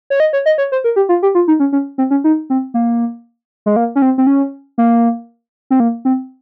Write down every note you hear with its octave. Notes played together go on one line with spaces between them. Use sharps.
C#5
D#5
C#5
D#5
C#5
C5
A#4
G4
F4
G4
F4
D#4
C#4
C#4
C4
C#4
D#4
C4
A#3
G#3
A#3
C#4
C4
C4
C#4
A#3
C4
A#3
C4